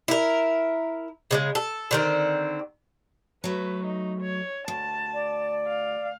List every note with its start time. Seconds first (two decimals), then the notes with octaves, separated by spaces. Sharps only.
0.08 E4 A#4
1.31 C#3 E3 G#3
1.55 A4
1.91 D3 D#3 C4
3.44 F#3 A3 B4
3.86 D#4
4.21 C#5
4.68 D2 A5
5.14 D5
5.67 F5